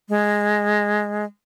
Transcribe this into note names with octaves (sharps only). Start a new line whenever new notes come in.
G#3